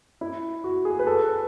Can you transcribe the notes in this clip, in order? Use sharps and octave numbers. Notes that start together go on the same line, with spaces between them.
E4
F#4
G#4
B4
A4
B4